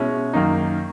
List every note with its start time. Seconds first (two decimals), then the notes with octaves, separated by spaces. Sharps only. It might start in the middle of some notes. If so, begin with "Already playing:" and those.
Already playing: B2 G#3 C#4 E4
0.33 F#2 D#3 A#3 D#4